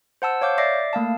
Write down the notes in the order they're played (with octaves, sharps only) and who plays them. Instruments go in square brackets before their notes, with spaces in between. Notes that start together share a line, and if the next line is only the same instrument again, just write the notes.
[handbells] C5 F#5 A5 E6
C#5 F5 D6 G6
D5 E5 D6 A#6 C7
A3 A#3 F5 A5